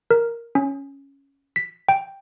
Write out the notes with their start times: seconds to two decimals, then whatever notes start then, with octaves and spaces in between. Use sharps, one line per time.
0.11 A#4
0.55 C#4
1.56 B6
1.89 G5